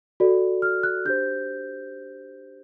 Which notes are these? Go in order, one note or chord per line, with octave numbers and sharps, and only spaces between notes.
F#4 A4 D5
F6
F#6
D4 G4 C5 G6